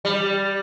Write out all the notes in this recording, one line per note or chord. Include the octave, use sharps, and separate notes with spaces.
G3